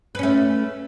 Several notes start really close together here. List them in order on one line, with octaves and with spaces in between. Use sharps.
B4 C#4 A3